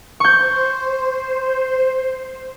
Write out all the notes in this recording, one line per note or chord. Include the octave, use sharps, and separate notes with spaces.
C5 C#6 G6